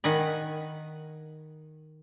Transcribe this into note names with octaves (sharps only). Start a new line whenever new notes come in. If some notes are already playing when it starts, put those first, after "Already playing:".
D#3 F#5 G#5 B5